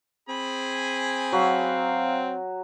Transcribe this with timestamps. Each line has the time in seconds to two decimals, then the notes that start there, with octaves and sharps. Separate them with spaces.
0.29 C4 G#4 G#5 B5
1.33 F#3 F5